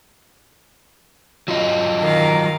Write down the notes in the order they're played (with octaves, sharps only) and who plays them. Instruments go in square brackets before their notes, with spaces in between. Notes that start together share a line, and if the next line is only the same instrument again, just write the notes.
[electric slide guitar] F#3 F4 D#5
[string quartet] D#3 A#4 F5